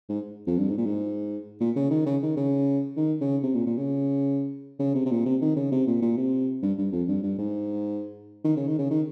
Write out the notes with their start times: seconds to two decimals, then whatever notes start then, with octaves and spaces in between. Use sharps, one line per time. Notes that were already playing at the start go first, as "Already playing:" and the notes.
0.09 G#2
0.47 F2
0.58 G2
0.69 G#2
0.77 A#2
0.86 G#2
1.60 A#2
1.76 C#3
1.91 D#3
2.06 C#3
2.22 D#3
2.37 C#3
2.97 D#3
3.21 C#3
3.43 C3
3.54 A#2
3.67 A#2
3.77 C#3
4.79 C#3
4.95 C3
5.06 C3
5.11 A#2
5.26 C3
5.41 D#3
5.56 C#3
5.72 C3
5.87 A#2
6.02 A#2
6.17 C3
6.62 G2
6.78 G2
6.92 F2
7.08 G2
7.23 G2
7.39 G#2
8.44 D#3
8.56 C#3
8.68 D#3
8.78 C#3
8.91 D#3